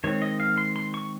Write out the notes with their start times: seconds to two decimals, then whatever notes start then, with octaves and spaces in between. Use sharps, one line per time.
0.04 D#3 G#3 C4 C#5
0.22 D#5
0.40 F5
0.58 C6
0.76 C6
0.94 C#6